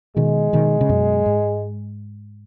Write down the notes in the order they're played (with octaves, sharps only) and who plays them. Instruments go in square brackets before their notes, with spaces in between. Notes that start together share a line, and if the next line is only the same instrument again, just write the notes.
[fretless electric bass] B2 D#3 [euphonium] G#3
[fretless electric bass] B2 D#3
C#3
F#2 B2
G#2